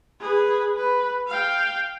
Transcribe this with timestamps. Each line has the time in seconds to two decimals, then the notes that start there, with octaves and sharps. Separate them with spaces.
0.20 G#4 B4
0.77 B4
1.28 F5 G5